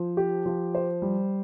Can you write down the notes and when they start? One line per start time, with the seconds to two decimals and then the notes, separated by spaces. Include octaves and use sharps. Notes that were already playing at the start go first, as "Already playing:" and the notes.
Already playing: F3 C5
0.17 G4
0.46 F3
0.75 C5
1.02 G3